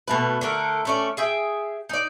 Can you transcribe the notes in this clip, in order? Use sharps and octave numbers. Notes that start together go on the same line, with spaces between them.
B2 A3 B4
D3 A3 A#4
A3 C#4 D5
G#4 E5 G5
D#4 D5